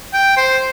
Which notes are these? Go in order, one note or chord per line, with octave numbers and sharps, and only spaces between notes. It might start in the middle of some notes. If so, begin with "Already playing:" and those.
G5
C5